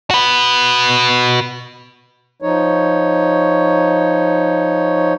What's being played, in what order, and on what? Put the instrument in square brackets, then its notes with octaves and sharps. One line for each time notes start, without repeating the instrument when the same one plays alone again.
[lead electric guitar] F#4 B4
[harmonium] F3 D#4 C#5